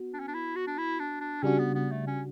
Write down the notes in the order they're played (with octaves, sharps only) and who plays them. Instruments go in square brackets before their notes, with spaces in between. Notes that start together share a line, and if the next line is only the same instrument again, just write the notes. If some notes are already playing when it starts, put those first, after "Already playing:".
Already playing: [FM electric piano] B3 F#4
[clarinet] D4
C#4
D4
E4
F#4
D4
E4
D4
D4
[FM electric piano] C#3 G3 D4 F#4 [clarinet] C#4
[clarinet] B3
B3
A3
C#4